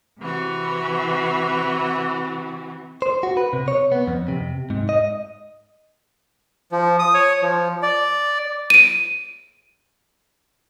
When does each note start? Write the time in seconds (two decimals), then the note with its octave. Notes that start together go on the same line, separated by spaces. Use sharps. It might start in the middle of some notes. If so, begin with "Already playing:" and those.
0.19 C3 E3 F#4
3.02 C5
3.23 F#4
3.37 B4
3.53 C3
3.68 C#5
3.92 B3
4.07 F2
4.28 C3
4.70 G#2
4.89 D#5
6.72 F3
6.99 D#6
7.14 C#5
7.42 F3
7.82 D5
8.70 D7 D#7